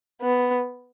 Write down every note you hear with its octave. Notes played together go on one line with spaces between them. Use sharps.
B3